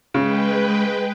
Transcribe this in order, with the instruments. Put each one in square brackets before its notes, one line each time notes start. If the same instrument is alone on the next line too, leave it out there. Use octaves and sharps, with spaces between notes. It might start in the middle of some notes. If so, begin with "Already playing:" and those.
[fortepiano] C#3 [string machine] G#3 B4 G5